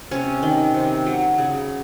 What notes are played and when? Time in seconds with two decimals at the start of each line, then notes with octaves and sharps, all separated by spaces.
0.11 C3 C#4
0.43 D#3
0.74 C3
1.06 F#3
1.38 C#3